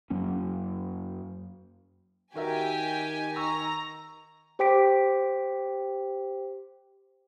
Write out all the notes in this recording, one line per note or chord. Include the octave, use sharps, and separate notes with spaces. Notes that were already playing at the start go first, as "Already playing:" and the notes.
F#2 F#3 A#3 C#4
D#3 F#4 G4 A#4 E5 G#5
A#5 C#6 E6
G4 C5 G5 D6 B6 D7